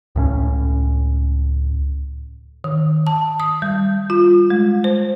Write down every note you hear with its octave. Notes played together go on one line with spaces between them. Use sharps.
C#2 A2 C#4
D#3
A5
D#6
G3
F4
G#3
C5